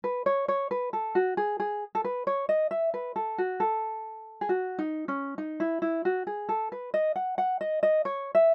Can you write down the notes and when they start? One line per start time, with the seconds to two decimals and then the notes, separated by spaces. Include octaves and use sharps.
0.04 B4
0.26 C#5
0.48 C#5
0.71 B4
0.93 A4
1.15 F#4
1.37 G#4
1.60 G#4
1.95 A4
2.05 B4
2.27 C#5
2.49 D#5
2.71 E5
2.94 B4
3.16 A4
3.38 F#4
3.60 A4
4.41 G#4
4.49 F#4
4.79 D#4
5.08 C#4
5.38 D#4
5.60 E4
5.82 E4
6.05 F#4
6.27 G#4
6.49 A4
6.72 B4
6.94 D#5
7.16 F#5
7.38 F#5
7.61 D#5
7.83 D#5
8.05 C#5
8.35 E5